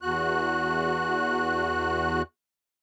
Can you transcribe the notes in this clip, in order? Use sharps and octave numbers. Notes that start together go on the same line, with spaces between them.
E2 F#4 F#6